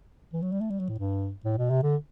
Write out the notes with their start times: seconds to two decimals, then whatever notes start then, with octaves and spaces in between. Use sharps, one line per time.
0.33 E3
0.42 F#3
0.52 G3
0.61 A3
0.70 G3
0.79 F#3
0.89 A2
0.99 G2
1.45 A2
1.58 B2
1.70 C3
1.83 D3